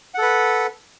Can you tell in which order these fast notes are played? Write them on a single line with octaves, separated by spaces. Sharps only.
F#5 A4 B4